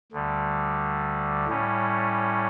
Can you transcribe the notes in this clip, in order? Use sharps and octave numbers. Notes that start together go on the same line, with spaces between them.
D2 D3 G3
A2 G3 C#4